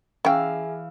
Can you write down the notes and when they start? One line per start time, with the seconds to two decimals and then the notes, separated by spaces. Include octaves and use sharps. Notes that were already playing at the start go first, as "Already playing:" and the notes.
0.25 E3 C#4 G#4 E5 F5 G5 G#5 E6